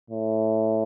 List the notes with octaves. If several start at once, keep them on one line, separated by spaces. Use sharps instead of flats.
A2